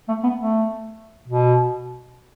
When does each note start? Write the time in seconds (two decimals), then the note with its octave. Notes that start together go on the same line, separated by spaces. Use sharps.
0.08 A3
0.23 B3
0.38 A3
1.28 B2